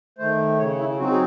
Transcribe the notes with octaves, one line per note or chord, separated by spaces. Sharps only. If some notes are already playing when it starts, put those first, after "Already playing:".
D#3 A3 C5
C#3 C#5
E4
F#3 C4 D#4 F#4
G#4